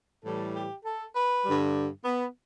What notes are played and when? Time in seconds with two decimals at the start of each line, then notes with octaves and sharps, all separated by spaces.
0.23 A2 E3 G3 A4
0.54 G4
0.83 A4
1.14 B4
1.44 G2 D3 G3
2.04 B3